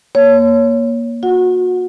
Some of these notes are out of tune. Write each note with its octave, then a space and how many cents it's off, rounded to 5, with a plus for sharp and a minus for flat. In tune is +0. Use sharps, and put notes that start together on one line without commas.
A#3 +20 C#5 +5
F#4 -30 F#5 -15